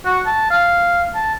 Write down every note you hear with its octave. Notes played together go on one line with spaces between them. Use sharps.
F#4
A5
F5
A5